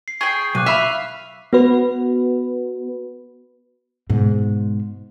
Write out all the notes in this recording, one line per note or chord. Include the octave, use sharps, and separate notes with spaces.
C7
G#4 G5 C#6
B1 D6 F#6 D#7
E5 F5 B5 B6 D#7
B3 F#4 B4
G#2 B2